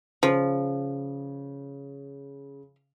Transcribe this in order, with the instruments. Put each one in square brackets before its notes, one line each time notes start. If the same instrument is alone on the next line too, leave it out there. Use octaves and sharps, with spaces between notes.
[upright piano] C#3 [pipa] F3